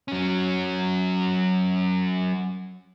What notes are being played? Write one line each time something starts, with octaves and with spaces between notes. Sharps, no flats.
F#3 C#4